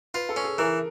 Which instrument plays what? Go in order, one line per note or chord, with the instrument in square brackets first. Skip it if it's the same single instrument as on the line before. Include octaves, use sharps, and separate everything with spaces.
[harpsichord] F4 [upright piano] B4
[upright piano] A4
[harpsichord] C#4
[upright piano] G#4
[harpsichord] E3 [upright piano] A#4